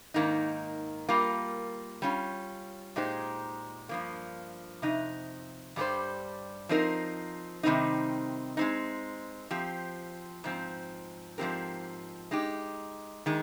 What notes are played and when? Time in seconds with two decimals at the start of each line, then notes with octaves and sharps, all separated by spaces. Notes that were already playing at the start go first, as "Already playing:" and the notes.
0.14 G#2 D#3 A#3 D#4
1.09 G3 A#3 F4 A#4
2.02 G3 C#4 F4
2.96 A#2 G#3 D#4 G4 C5
3.89 G2 F3 A#3
4.82 F2 C3 D#4
5.76 G2 G3 C#4 G4 C5
6.69 F3 C4 D#4 A#4
7.63 C3 D#3 G3 C4 D#4
8.57 G#3 C4 D#4
9.51 F3 C4 G4
10.44 G#2 F3 C4
11.38 G#2 F3 C4 G4 A#4
12.31 G#3 D#4 G4
13.26 D#3 G#3